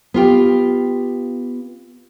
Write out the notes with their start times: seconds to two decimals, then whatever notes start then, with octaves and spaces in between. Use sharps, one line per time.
0.14 B3 F4 G4